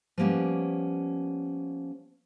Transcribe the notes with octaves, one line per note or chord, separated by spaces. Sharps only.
F3 G3 A#3 B3 C#4